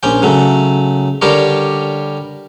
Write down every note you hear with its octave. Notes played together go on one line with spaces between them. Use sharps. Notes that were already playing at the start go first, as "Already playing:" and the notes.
A#1 C#4 G5
C#3 F#3 A3
D3 G3 G4 A#4 C#5